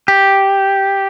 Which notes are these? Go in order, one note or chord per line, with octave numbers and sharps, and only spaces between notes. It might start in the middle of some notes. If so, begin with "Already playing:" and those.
G4